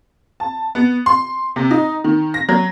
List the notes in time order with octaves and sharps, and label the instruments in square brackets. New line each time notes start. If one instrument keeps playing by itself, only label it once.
[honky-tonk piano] A5
B3
C6
C3
D#4
D#3
A#6
F#3